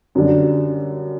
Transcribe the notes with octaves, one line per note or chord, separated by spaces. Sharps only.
F#2 D3 G3 D4